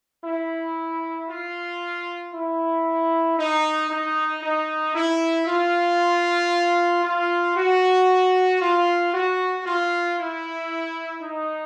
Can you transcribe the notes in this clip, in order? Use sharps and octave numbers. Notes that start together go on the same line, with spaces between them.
E4
F4
E4
D#4
D#4
D#4
E4
F4
F4
F#4
F4
F#4
F4
E4
D#4